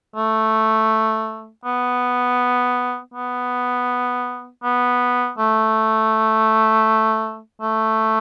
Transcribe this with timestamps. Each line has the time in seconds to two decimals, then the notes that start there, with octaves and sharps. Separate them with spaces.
0.16 A3
1.65 B3
3.14 B3
4.64 B3
5.38 A3
7.62 A3